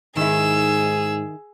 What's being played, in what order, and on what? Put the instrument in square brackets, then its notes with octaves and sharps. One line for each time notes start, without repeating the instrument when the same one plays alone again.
[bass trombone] G#2 [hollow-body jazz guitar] D#3 E4 [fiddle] G#4 [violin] E6